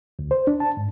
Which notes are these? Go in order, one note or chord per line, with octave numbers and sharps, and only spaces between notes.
D2
C5
D4
A5
G#2